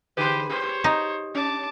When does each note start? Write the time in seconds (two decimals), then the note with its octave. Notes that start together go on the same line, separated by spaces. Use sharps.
0.17 D3 G4 G#4 B4 C5
0.49 G4 C5 C#5
0.84 D#4
1.35 C#4 A5 D6